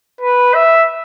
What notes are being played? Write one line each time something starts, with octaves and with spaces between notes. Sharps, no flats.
B4
E5